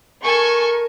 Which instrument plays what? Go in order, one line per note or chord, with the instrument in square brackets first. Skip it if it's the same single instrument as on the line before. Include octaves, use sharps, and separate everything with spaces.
[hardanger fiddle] A4 G#5 [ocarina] A#4 [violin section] C#6